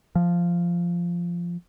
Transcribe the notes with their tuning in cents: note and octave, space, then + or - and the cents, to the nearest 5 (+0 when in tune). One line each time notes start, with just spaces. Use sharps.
F3 -10